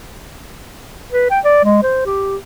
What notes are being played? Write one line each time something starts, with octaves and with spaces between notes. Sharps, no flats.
B4
G5
D5
G#3
C5
G4